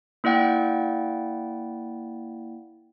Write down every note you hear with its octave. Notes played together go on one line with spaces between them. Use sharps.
A#3 E4 D5 F#5 G5